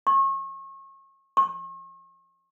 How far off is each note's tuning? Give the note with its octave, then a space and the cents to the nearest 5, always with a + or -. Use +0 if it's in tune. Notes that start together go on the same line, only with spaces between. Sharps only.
C#6 -35
C#6 -45